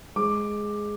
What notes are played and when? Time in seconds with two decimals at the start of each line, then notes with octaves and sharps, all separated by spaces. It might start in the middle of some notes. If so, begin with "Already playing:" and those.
0.16 G#3 D6